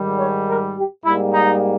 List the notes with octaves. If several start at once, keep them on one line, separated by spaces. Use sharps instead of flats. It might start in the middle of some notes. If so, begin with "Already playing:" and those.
Already playing: G#2 D#3 G3
C#5
A#4
G4
G#2 G3 A#3 E4
D#4